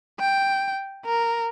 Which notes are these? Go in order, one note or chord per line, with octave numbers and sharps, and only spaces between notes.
G5
A#4